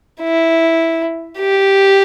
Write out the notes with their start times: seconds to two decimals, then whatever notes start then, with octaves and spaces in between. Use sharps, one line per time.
0.21 E4
1.39 G4